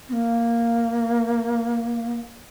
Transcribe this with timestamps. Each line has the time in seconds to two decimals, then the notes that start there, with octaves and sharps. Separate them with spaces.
0.09 C4
0.13 A#3